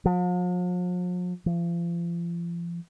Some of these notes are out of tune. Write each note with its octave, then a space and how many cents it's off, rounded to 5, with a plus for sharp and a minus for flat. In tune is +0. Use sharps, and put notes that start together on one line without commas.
F3 +45
F3 -35